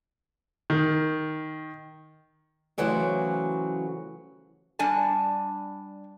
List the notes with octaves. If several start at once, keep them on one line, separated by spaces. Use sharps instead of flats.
D#3
C#3 E3 F#3 A3 G4 C5
G3 D4 G#5 A5